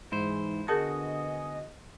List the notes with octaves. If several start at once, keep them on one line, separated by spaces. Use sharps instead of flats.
G#2 E3 G#3 E4 C5
D3 B3 F#4 G#4 A#4 D#5 G#5 A5